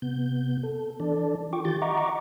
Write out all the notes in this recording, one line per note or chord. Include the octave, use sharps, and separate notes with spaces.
C3 B3 G6
A4
E3 D4 A4 D5
F4 G5 C#6 D6
D#3 E3 F4 G4 G6 A6
D#5 E5 F#5 A#5 C#6 D6